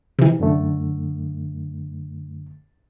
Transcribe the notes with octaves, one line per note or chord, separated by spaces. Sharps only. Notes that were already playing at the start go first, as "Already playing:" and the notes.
C3 E3
F#2 D3 A3